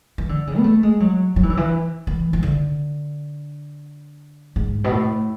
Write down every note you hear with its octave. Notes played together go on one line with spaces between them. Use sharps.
E3
D3
C#3
B3
A3
G#3
F#3
F#3
E3
D3
E3
E3
E3
D3
G#2
B2
A2